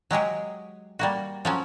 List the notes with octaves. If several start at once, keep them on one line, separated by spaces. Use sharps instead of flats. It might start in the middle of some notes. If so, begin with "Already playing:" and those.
F#3 G#3 G4 G#4
G3 A#3 F#4
F3 F#3 C#4